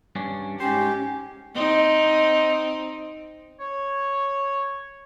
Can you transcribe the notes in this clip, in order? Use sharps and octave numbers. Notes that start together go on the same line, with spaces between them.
G2 C#4 D4
G#2 C#4 G4 C5
C4 D#4
C#5